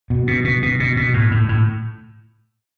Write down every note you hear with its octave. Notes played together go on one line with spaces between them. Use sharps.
B2
B2
B2
B2
B2
B2
A2
A2
A2